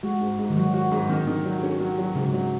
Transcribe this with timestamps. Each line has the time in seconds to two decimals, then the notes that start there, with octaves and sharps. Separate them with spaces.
0.03 G#3 F#4
0.21 G#2
0.39 G#2
0.50 D#3
0.56 F#3 F#4
0.74 F#4
0.91 G#2
1.10 D#3
1.27 D#3
1.45 F#3
1.63 C#4
1.80 F#3
1.99 F#3
2.15 G#2 C#3
2.34 F#3